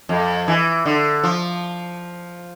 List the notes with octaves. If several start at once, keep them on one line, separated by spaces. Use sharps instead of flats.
F2
E3
D3
F3